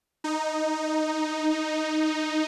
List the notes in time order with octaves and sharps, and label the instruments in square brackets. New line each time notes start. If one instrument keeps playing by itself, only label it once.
[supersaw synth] D#4